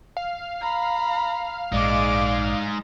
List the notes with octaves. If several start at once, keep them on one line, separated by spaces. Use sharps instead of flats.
F5
A#5 B5
A#1 G#2 G#3 D#4 D5 D6